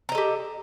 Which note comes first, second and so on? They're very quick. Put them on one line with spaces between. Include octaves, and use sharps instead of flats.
A#5 D#5 A4 G4